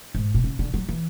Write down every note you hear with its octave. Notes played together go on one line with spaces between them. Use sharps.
G#2
B2
C#3
D3
F#3
E3